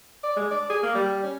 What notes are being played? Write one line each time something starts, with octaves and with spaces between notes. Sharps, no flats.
D5
G#3
D5
G#4
A#3
G3
C#4